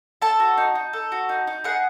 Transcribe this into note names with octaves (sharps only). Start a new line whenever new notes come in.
A4 A5
F#4
D#4
D#4
A4
F#4
D#4
D#4
G#4 F#5